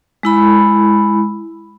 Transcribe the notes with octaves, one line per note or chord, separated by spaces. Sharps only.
G#3 E4 B5